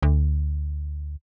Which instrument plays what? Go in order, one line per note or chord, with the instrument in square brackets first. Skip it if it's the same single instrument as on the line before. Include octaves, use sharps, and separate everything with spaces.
[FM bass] D2